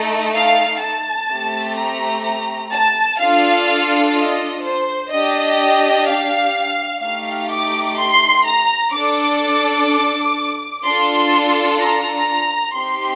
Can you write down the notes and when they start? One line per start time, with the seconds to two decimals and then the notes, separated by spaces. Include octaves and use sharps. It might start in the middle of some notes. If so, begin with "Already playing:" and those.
Already playing: A3 D#4 A4
0.35 F5
0.81 A5
1.30 A3 C4 G4
1.77 A#5
2.73 A5
3.21 D4 F4 A4 F5
4.15 D#5
4.63 C5
5.11 D4 G4 D#5
6.07 F5
7.02 A3 D#4 G4 F5
7.51 D6
7.98 C6
8.45 A#5
8.93 D4 A4 D6
10.84 D4 F4 A4 C6
11.79 A#5
12.75 C4 D#4 G4 C6